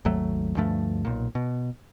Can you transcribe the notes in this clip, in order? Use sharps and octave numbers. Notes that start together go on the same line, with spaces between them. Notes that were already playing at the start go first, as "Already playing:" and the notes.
G#1 D#2 F#3 A3
D2 G2 F3 A3
B1 A#2
B2